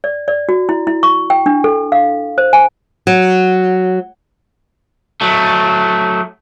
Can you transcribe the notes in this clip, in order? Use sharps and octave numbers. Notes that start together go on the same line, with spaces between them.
D5
D5
F#4
E4
E4
C#6
G5
D4
A4
F5
C5
G#5
F#3
F#3 A3